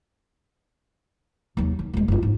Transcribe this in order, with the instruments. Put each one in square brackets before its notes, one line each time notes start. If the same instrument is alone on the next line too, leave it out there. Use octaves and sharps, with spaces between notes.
[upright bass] D#2 F#3
D#3
D#1 G#3
F#1 F4
G#2